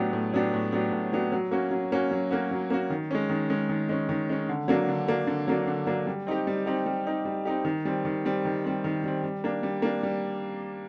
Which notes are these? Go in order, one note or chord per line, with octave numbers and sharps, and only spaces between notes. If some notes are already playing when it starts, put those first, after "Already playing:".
Already playing: A2 F#3 B3 D4 G4
A2
F#3 B3 D4 G4
A2
F#3 B3 D4 G4
A2
F#3 B3 D4 G4
F#3
A#3 C#4 F#4
F#3
A#3 C#4 F#4
F#3
A#3 C#4 F#4
F#3
A#3 C#4 F#4
D#3
G#3 C#4
D#3
G#3 C#4
D#3
G#3 C#4
D#3
G#3 C#4
D3
F#3 A#3 D4
D3
F#3 A#3 D4
D3
F#3 A#3 D4
D3
F#3 A#3 D4
G3
C4 D#4 G4
G3
C4 D#4 G4
G3
C4 D#4 G4
G3
C4 D#4 G4
D#3
G3 C4
D#3
G3 C4
D#3
G3 C4
D#3
G3 C4
G3
A#3 D4
G3
A#3 D4
G3